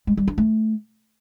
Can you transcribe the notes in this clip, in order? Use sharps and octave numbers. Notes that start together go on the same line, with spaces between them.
G#3
G3
D4
A3